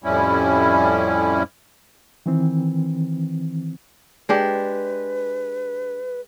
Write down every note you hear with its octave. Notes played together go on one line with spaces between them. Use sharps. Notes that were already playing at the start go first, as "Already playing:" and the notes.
F2 A2 G3 C#4 E4
D#3 E3 C4
G#3 D4 G4 B4